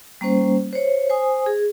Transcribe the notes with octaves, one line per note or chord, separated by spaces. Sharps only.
G3 A#3 C#4 C5
C5 C#5
C5 G#5 D#6
G#4